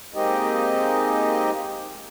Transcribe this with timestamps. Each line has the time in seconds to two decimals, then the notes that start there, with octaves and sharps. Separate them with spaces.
0.14 G#3 A#3 C4 D#4 G4 D#5